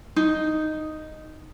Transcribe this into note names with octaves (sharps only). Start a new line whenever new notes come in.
D#4